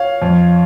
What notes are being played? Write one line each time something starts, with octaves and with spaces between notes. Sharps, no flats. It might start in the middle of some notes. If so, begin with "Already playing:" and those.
Already playing: C#5 F5
F2